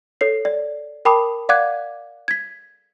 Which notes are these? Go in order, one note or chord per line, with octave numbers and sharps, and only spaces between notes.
A4 C#5 C7
D5
A#4 G5 A5 B5 D6 D#6
D5 F5 F#5 D6 F#6 G#6
G#6 B6